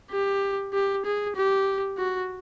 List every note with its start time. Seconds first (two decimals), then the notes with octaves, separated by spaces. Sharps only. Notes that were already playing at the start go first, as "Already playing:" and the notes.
0.12 G4
0.74 G4
1.06 G#4
1.36 G4
1.98 F#4